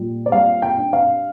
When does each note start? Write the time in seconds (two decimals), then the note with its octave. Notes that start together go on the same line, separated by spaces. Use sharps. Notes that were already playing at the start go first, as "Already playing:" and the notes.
Already playing: A#2 G3
0.26 D5
0.32 G3 F5
0.62 G5
0.78 D4
0.93 F5